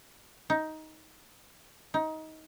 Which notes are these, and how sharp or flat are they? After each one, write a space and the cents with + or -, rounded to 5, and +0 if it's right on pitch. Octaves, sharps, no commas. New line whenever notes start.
D#4 +10
D#4 +20